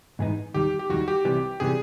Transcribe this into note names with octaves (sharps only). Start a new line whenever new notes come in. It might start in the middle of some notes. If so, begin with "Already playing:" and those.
G#2 E3 G#3 B3 D#4
D#2 D#3 G3 G4
G4
D#2 D#3 G3 F#4
G4
C2 C3 E3 G3
C3 E3 G3 G#4